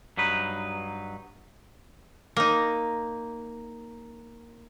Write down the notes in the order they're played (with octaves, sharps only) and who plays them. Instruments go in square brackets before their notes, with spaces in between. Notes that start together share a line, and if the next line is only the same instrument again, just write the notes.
[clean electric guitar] G2 F#3 D#4 B4
[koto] A#3 D#4